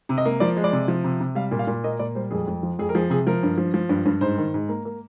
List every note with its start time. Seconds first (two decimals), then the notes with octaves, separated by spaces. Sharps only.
0.09 C3
0.18 D#5
0.25 A#3
0.40 F3 D5
0.57 G#3
0.64 D5
0.73 C3
0.88 F3
1.04 C3
1.20 C3
1.35 G3 F5
1.51 A#2
1.59 F5
1.67 A#2
1.84 A#3 D#5
1.99 A#2 D5
2.15 G3 C5
2.31 F2 G#4
2.48 F2
2.63 F3
2.79 F2 G#4
2.89 A#4
2.95 F3 G#4
3.10 C3 G#4
3.27 F3 A#4
3.43 G2
3.58 F3
3.74 F3
3.89 G2
4.06 G2
4.21 G#2 C5
4.38 D#3
4.54 G#2
4.69 A#3
4.85 A#3